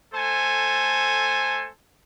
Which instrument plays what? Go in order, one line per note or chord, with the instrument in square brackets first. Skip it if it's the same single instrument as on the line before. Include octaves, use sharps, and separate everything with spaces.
[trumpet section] A3 A4 C5 G#5